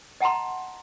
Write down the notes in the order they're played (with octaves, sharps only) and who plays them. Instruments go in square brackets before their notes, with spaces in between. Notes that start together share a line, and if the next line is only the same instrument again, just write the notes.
[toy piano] D#5 F#5 A5 A#5 C6